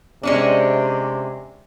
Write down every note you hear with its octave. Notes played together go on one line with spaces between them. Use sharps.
C3 G#3 C#4 D4